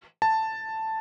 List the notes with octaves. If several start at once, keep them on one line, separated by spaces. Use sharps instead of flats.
A5